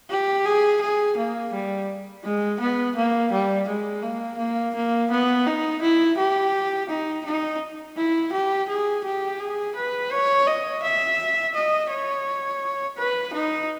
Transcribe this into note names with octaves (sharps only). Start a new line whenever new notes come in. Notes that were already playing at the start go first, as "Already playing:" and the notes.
G4
G#4
G#4
A#3
G3
G#3
B3
A#3
G3
G#3
A#3
A#3
A#3
B3
D#4
E4
G4
D#4
D#4
E4
G4
G#4
G4
G#4
B4
C#5
D#5
E5
D#5
C#5
B4
D#4